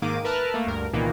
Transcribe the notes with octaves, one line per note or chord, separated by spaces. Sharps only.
G#2 D#3 A#3 D6 D#7
A#4 B4 E5 A5 F6 F#6
A3 A#3
D2 G2 A#4
C2 A#2 D#3 E3 A#3 B3